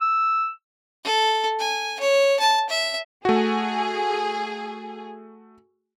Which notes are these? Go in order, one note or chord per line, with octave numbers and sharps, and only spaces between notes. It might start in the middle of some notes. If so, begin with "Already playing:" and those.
E6
A4
G#5
C#5
A5
E5
A3 F#4 G#4